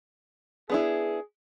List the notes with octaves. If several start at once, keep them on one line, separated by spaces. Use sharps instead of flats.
B3 D4 E4 G#4